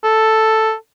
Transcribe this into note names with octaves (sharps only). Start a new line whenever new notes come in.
A4